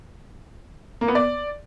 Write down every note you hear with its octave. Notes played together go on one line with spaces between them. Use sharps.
A#3
B3
D5